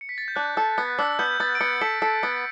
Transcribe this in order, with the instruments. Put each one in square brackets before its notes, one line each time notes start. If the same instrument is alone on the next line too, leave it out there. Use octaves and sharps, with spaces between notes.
[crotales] C#7
B6
A6
G6
[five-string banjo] D4 [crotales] F#6
[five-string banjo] A4
B3
[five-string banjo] D4 [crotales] E6
[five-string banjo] B3 [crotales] G6
[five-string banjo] B3 [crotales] A6
[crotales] D7
[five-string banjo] B3 [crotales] C#7
[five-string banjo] A4 [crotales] B6
[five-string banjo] A4 [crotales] B6
[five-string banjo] B3